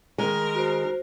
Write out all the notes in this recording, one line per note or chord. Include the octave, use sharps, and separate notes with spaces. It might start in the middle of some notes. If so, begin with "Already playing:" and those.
D#3 G#3 A#4
F#4 C5